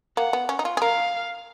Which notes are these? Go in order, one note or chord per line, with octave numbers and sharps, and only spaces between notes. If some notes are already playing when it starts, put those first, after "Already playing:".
A#3 F#5
B3
C#4
D#4
F4
G#4
A#4 F5